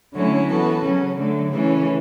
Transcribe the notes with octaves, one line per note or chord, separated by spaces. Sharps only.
D3 F#3 A3 C#4 E4
E3 B3 F#4 A4
C#3 F#3 C#4
D3 F#3 A3
C#3 E3 A3 C#4